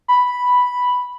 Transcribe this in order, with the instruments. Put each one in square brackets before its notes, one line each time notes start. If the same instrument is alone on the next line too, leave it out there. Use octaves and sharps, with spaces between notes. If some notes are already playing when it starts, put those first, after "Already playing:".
[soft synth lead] B5